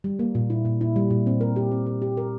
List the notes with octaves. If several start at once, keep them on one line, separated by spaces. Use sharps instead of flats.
G3
A#3
A#2
E4
A#2
E4
G3
A#2
C4
A#4
G4
C4
A#4
G4
A#4